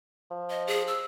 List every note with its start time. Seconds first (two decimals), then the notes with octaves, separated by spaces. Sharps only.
0.31 F3
0.50 D#5
0.67 G#4
0.87 E6